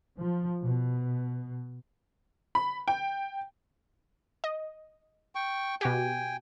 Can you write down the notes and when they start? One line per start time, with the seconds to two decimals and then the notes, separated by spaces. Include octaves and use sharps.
0.20 F3
0.62 B2
2.55 B5
2.88 G5
4.44 D#5
5.35 G5 C#6
5.81 B2 F#4 G4 G5 G#5